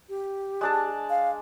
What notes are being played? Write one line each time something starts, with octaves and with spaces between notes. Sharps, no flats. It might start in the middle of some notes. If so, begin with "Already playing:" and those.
G4
G#3 D4 A5
F5